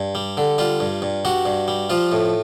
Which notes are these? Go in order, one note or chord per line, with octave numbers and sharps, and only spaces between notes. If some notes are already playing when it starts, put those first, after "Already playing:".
Already playing: G2
G3
D3
G3 F4
G2
G2
G3 F#4
G2
G3
F3 F4
A2